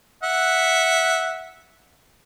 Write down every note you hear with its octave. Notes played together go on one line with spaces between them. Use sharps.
E5 F#5